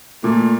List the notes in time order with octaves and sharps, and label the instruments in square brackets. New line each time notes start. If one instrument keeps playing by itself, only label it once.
[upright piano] A#2 [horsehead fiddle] A3